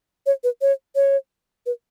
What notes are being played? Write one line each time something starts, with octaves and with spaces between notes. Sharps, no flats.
C#5
B4
C#5
C#5
B4